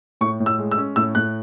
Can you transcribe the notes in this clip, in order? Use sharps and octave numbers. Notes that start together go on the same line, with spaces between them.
A2 C#6
A2
E6
G#3
E6
C#4
A2 E6
A2 F#6